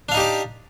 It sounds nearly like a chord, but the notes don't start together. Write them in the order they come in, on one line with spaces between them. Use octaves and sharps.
D4 F5 D#4 G4 D5